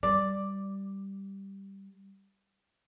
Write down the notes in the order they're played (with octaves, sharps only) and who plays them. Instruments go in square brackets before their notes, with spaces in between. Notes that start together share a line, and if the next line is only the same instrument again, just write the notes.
[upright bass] G3 [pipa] D5